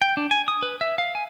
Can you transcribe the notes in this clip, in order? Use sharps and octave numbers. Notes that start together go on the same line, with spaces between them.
G5
D4
G#5
D#6
B4
E5
F5
G#5